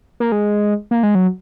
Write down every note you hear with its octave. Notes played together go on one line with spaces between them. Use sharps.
A#3
G#3
A#3
G#3
F#3